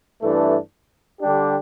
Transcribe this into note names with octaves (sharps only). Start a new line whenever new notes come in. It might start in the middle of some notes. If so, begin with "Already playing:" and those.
G2 E3 A3 D4 A4
D3 G3 D4 G4